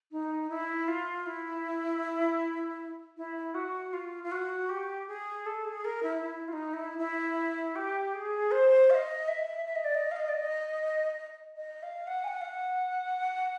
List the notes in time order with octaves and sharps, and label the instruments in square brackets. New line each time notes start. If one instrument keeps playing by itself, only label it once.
[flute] D#4
E4
F4
E4
E4
F#4
F4
F4
F#4
G4
G#4
A4
G#4
A#4
E4
E4
F4
D#4
E4
E4
G4
G#4
C5
F5
D#5
E5
E5
D#5
D5
D#5
F5
D#5
D5
D#5
D#5
F5
F#5
G#5
F#5
F5
F#5